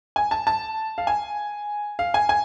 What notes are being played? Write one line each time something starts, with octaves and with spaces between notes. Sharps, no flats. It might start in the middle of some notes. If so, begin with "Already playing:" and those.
G#5
A5
A5
F5
G#5
F5
G#5
G#5